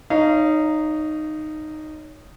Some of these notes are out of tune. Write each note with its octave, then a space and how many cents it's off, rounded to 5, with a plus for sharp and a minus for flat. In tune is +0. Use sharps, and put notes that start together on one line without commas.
D#4 -10 C#5 +20 F5 -30